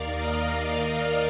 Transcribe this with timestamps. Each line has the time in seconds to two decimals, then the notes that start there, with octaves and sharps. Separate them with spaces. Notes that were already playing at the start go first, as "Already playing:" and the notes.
Already playing: D#2 D#3 A#4 D5 F5
0.11 D#5
0.41 D5